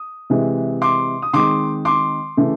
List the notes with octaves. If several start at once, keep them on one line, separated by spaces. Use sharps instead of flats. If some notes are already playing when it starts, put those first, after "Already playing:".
Already playing: D#6
C3 E3 G#3
C6 D6
D#6
D#3 G#3 C4 C6 D6
C6 D6
C#3 E3 A3